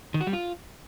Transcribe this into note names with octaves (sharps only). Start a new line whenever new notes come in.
D#3
F#4
G3
F4